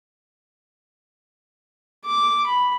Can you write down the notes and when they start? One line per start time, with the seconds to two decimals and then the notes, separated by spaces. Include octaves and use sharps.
2.05 D6
2.47 B5